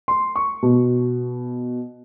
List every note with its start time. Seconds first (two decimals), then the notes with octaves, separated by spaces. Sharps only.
0.08 C6
0.36 C#6
0.63 B2